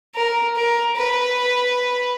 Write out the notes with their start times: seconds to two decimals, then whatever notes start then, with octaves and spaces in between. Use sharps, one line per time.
0.15 A#4
0.56 A#4
0.97 B4